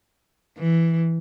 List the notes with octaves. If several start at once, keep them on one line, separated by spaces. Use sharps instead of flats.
E3